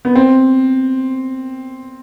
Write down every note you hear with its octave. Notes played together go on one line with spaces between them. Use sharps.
B3
C4